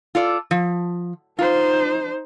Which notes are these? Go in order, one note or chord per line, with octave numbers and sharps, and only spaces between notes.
F4 A4 D5
F3
D#4 F4 C5